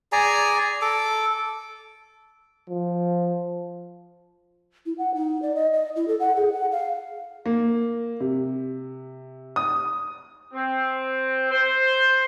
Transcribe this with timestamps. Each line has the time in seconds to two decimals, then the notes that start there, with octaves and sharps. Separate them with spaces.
0.12 G#4 D5 G#5 A#5
0.82 A4 D6
2.70 F3
4.86 E4
4.98 F#5
5.15 D#4
5.42 D5
5.55 D#5
5.73 D#5
5.96 E4
6.08 A4
6.20 F#5
6.36 G#4
6.53 F#5
6.72 F5
7.46 A#3
8.20 C3
9.56 D#6
10.54 C4
11.52 C5